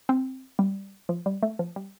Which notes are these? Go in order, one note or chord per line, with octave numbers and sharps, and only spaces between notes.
C4
G3
F3
G3
A3
F3
G3